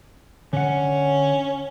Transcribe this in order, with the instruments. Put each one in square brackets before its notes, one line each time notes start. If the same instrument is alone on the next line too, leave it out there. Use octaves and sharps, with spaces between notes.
[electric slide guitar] D3 F#5 [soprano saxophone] C#4